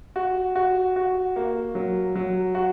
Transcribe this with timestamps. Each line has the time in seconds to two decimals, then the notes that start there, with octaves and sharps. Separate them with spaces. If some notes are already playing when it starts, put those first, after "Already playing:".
0.16 F#4
0.56 F#4
0.96 F#4
1.36 A#3
1.75 F#3
2.15 F#3
2.55 F#4